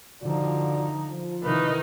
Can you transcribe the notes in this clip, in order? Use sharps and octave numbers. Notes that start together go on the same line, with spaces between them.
D3 F3 D#4 F4 F#4 D5
F3
C3 D#3 E3 D#4 B4